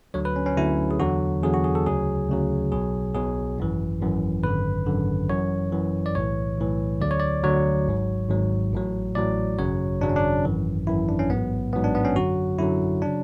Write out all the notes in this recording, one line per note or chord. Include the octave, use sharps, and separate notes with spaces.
D2 D3 F#3 C#5
B4
C#4
C#4
D2 D3 F#3 E4
G#4
E2 D3 F#3 F#4
E2 D3 F#3 G#4
F#4
G#4
A4
D2 C#3 F#3 G#4
D2 C#3 F#3
B1 B2 F#3 G#4
B1 B2 F#3 G#4
G#1 F#2 E3
G#1 F#2 E3
G#1 F#2 D3 B4
G#1 F#2 D3
F#2 E3 C#5
F#2 E3
D5
B1 A2 E3 C#5
B1 A2 E3
D2 D3 F#3 D5
C#5
D5
D2 D3 F#3 C#5
G#1 G#2 F#3
G#1 G#2 F#3
A1 A2 F#3
A1 A2 F#3 D5
G#1 F#2 C#3 F#3 C#5
G#1 F#2 C#3 F#3 D4
C#4
D4
G#1 F#2 E3
G#1 F#2 E3 E4
D4
C#4
A1 G#2 F#3 B3
A1 G#2 F#3 B3
D4
B3
C#4
F#2 D3 F#3 F#4
F#2 D3 F#3 E4
C#3 F#3 D4